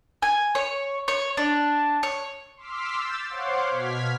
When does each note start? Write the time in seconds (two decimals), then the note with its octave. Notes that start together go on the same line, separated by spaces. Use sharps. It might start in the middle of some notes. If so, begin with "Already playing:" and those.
0.22 G#5
0.55 C#5
1.08 C#5
1.37 D4
2.03 C#5
2.56 C6 D6 E6 F6 B6
2.95 E6 G6 A6
3.29 C5 C#5 F5 F#5 C6 D6
3.70 B2 F6 G#6 B6